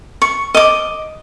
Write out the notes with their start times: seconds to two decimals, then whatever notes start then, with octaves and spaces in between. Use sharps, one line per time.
0.22 C#6
0.55 D#5 D6